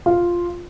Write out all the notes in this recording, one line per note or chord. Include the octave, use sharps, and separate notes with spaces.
F4